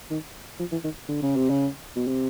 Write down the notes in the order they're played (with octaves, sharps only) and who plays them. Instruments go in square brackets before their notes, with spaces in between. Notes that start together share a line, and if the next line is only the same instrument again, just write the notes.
[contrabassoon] D#3
F3
E3
D#3
D3
C#3
C3
C#3
B2
C3